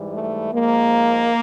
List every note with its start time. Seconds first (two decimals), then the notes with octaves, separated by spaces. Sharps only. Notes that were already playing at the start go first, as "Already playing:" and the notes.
Already playing: G#2 E3 G3
0.12 A3
0.53 G#2 F3 G#3 A#3